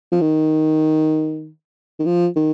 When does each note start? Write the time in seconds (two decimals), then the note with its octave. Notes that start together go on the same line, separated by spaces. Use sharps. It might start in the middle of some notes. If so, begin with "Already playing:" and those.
0.12 F3
0.21 D#3
1.99 D#3
2.06 F3
2.36 D#3